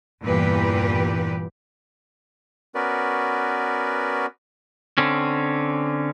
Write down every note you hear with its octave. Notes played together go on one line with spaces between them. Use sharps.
E2 G2 A#2 E3 G4 B4
B3 C#4 F#4 A#4 B4 D5
D3 C4 C#4